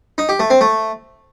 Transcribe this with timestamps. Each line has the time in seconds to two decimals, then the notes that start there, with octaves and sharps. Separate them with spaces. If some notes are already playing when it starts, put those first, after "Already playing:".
0.18 D#4
0.29 G4
0.40 A3
0.50 C4
0.61 A3